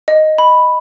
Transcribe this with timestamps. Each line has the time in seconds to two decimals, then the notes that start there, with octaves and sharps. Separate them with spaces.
0.08 D#5
0.38 B5